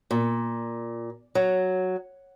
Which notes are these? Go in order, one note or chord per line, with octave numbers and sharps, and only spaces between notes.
A#2
F#3